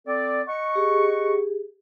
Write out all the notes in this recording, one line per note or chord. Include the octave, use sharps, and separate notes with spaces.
C4 A4 D5
D#5 F#5 C#6
G4 G#4